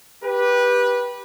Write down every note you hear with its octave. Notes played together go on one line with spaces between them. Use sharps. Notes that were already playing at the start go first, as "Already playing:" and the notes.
G4 B4